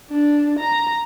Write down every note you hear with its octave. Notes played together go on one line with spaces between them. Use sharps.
D4
A#5